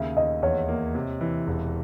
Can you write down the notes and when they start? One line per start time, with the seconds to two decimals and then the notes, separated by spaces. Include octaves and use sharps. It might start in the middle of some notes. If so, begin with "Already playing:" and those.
Already playing: D#2 C#3 E5
0.16 D#2 D#5
0.42 E2 C#5
0.68 A#3
0.95 C3
1.21 E3
1.47 E1